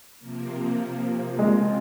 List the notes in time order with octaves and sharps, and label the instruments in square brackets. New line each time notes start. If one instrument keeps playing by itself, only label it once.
[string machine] C3 F3 A#3
[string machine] C#3 F3 C4 F4 [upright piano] G#3